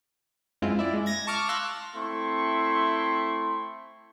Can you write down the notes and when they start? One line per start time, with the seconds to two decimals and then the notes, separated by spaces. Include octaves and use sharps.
0.62 F#2 G#3 C4 E4 F4
0.79 E4 D5
0.94 G#3
1.06 G#6 A#6
1.27 A5 C#6 D6 F6
1.49 F5 C6 E6 F#6 A#6
1.95 A3 C4 E4 C6 C#6